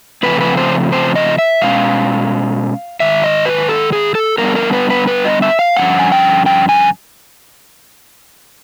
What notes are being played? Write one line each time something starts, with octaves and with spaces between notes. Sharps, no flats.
C#3 F3 A3 C4 B4
B4
C5
C5
D#5
E5
B2 G#3 C#4 F5
G#2 D#3 E5
D#5
B4
A4
G#4
A4
D3 G3 B3 D4 A#4
A#4
B4
B4
B4
D#5
E5
F5
G2 D3 F3 C#4 F#5
G#5
G5
G5
G#5